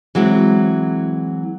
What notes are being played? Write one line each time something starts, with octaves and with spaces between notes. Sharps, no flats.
E3 F#3 G#3 C4